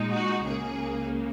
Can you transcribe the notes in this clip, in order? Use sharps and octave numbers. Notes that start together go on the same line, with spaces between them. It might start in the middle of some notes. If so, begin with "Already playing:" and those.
Already playing: A#2 G#3 D#4
F#4
C#2 C#3 A#3 G#4